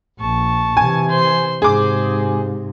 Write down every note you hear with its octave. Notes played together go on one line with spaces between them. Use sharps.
A#1 A5 C#6
C3 E3 G#5
C5 C6
G#2 C3 G#4 C5 D6